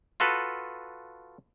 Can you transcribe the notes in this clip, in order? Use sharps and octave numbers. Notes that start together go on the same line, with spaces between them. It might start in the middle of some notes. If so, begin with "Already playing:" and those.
F4 F#4 A4 B4